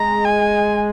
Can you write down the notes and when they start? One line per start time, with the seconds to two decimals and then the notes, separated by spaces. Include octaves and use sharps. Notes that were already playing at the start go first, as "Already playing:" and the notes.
Already playing: G#3 A#5
0.25 G#5